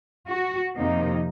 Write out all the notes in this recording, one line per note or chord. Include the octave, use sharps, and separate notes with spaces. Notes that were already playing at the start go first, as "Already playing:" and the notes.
F#4
F2 C3 D#3 A#3 D#4